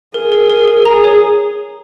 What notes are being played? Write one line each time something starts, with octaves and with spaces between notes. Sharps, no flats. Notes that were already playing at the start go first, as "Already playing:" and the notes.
G#4 A#4
A#4
A#4
A#4
G#4 A#5
C#5